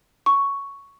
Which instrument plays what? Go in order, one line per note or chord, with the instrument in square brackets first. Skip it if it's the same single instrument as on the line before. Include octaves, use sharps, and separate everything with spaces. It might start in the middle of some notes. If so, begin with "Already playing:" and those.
[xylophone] C#6